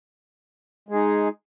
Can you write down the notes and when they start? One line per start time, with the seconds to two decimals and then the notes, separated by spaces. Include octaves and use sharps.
0.89 G#3
0.91 G#4
0.94 D#4